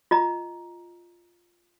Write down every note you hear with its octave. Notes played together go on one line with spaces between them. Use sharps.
F4 D#5 A#5